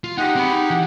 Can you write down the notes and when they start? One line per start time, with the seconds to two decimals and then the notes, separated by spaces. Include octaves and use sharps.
0.04 F4
0.18 D#4 G4 G#4 F#5
0.36 C4 B5
0.53 D#4
0.70 E3 E4